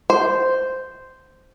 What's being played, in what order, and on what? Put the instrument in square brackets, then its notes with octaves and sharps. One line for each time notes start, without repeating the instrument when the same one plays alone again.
[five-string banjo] C5